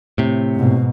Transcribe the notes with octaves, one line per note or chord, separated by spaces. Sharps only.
A2 C3
G#2 B2